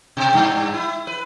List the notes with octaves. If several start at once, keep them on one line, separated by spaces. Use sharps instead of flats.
B2
G2
E4
B4